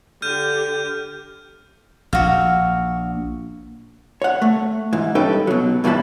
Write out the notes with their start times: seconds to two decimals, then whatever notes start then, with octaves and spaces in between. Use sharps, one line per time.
0.22 D3 G4 F6 G6 D#7
2.13 A#1 F#4 F5
4.22 C#5 F#5
4.42 A3
4.93 G#2 E3
5.15 G2 C#4 D#4 A4 B4 G5
5.47 B2 F#3
5.84 G2 B2 E3 F#4 B4 A5